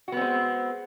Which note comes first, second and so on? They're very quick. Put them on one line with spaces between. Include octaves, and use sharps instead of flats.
F#4 B3 C4 G#3